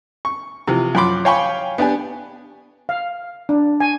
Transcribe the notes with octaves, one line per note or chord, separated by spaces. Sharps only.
C#6
C3 E3 F3
F#2 F3 B5 C6 D6
C#5 F5 G5 G#5 B5 C#6
B3 D4 G4 G#5
F5
D4
G#5